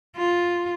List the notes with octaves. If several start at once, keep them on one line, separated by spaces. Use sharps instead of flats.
F4